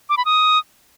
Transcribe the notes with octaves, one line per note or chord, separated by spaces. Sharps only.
D6
B5
D#6